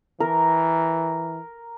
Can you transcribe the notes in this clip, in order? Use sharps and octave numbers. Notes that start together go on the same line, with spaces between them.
E3 A#4